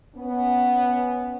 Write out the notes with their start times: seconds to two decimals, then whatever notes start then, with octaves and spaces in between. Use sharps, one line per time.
0.15 B3 C#4